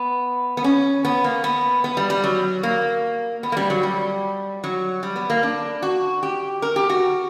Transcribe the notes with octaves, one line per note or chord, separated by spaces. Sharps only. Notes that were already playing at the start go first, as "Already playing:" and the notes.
Already playing: B3
B3
C#4
B3
A#3
B3
B3
G3
G3
F#3
A#3
B3
A#3
G3
F#3
G3
F#3
G3
B3
A#3
D4
F#4
G4
A#4
G4
F#4